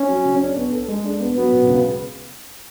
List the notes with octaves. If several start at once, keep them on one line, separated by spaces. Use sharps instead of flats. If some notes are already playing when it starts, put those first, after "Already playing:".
Already playing: C#4
F#3
C#3
D4
B3
A4
G#3
D4
B3
F#3 B3
B2
C#2